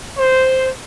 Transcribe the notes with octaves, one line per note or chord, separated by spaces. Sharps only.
C5